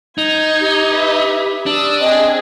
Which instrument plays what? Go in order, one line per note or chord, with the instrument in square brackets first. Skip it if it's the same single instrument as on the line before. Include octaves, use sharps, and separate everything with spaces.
[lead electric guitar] D#4 [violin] G6 G#6
[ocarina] G4
[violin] B4 E5
[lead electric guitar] D4 [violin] D#6 E6
[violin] C4 G#4 [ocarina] D#5